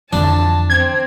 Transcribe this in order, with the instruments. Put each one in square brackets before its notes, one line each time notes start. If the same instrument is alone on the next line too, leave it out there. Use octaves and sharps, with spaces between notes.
[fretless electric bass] F2 D3 E3 [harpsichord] D4 [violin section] A5
[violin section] C4 [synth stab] G#6